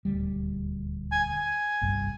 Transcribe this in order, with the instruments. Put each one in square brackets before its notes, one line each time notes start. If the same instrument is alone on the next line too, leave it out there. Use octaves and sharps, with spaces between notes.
[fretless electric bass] D#1 D2 G3
[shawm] G#5
G#5
[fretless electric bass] G1 C2 G2